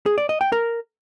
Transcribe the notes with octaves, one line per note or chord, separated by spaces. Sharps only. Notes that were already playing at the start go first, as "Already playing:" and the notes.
G#4
D5
D#5
G5
A#4